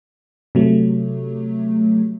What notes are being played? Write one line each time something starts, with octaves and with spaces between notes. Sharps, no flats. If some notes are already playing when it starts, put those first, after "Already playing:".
C3 F#3 A3